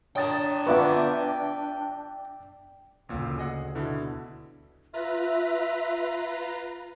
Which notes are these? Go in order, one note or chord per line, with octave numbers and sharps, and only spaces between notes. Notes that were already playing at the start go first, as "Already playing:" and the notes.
D4 C#5 G5 A#5 D#6 A6
B3 F4 B4 D5 E5 C#6
A1 D2 A#2 C#3 E6
G#4 D#5 F#5
B2 D3 E4
F4 B4 E5 A#5